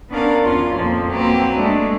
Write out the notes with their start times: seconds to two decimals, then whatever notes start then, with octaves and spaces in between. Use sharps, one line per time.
0.10 B3 C#4 D4 A#4 D5 F5
0.45 E2 C#4 F4 C6
0.75 F2 A#2 F3 A#3
1.10 F#3 A#3 C4 G4 B4
1.57 G#3 A3 D4